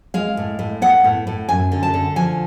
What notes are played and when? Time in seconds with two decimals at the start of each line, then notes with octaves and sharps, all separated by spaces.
0.14 G#3 F5
0.37 A2
0.59 A2
0.82 B3 F#5
1.04 A2
1.27 A2
1.49 F#2 G#5
1.72 D3
1.83 A5
1.94 D3
2.16 F3 G#5